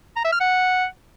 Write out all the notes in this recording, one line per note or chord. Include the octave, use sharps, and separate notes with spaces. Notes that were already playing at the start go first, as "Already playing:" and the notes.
A#5
E5
F6
F#5